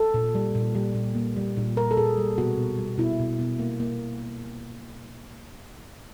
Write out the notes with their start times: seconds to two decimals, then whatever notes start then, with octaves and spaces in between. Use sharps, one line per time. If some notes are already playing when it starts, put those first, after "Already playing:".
Already playing: A4
0.14 A#2
0.35 G3
0.55 A#2
0.75 G3
0.95 A#2
1.15 A#3
1.36 G3
1.57 A#2
1.77 A#2 A#4
1.91 A4
1.97 A#2 G#4
2.17 G3
2.38 B2 F#4
2.57 B2
2.78 G3
2.98 B2 E4
3.20 B2
3.39 B2
3.59 A#3
3.80 A#3